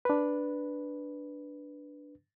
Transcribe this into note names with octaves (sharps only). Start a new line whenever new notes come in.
D4 B4